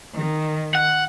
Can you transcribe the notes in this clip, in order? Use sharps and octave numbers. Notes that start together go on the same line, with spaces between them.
D#3
F#5